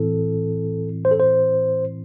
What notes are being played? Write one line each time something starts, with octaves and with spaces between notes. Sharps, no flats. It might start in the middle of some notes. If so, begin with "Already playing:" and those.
Already playing: A2 E3 C4 E4 A4
C5
A4
C5